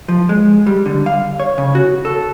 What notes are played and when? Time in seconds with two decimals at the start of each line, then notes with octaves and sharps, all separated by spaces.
0.08 F3
0.29 G#3
0.67 G3
0.86 D3
1.06 F5
1.40 C#5
1.58 C#3
1.75 F#4
2.05 A4